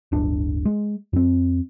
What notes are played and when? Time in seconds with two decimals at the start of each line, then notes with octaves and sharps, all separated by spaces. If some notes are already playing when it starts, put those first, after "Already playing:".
0.12 D1 G1 D4
0.65 G#3
1.13 F2 C4